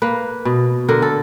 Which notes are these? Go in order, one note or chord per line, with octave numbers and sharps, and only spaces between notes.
A#3 B4
B2
D3 A#4
A4